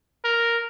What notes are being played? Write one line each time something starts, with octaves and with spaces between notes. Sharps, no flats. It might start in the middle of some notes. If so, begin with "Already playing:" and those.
A#4